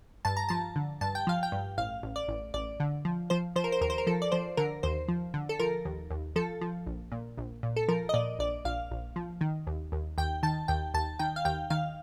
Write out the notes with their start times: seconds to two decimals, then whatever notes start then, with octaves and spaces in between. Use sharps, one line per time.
0.25 G2 A5
0.37 A#5
0.49 F3 A5
0.76 D3
1.01 G2 A5
1.15 G5
1.27 F3 F5
1.43 G5
1.52 G2
1.78 A1 F5
2.03 A1
2.16 D5
2.28 A1
2.54 A1 D5
2.80 D3
3.05 F3
3.30 F3 C5
3.56 F3 C5
3.64 A#4
3.72 C5
3.81 D#2 A#4
3.90 C5
3.98 A#4
4.07 F3 A4
4.22 D5
4.32 F3 C5
4.57 D3 A#4
4.83 D#2 C5
5.08 F3
5.34 D3
5.49 A4
5.60 F3 A#4
5.85 D#2
6.10 D#2
6.36 F3 A4
6.61 F3
6.86 A#1
7.12 A#2
7.38 A#1
7.63 A#2
7.76 A4
7.88 F3 A#4
8.09 D#5
8.14 A#2 D5
8.39 A#1 D5
8.65 A#1 F5
8.91 A#1
9.16 F3
9.41 D#3
9.67 D#2
9.92 D#2
10.18 D#2 G5
10.43 D#3 A5
10.68 D#2 G5
10.94 D#2 A5
11.19 D#3 G5
11.36 F5
11.45 D#2 G5
11.70 D#3 F5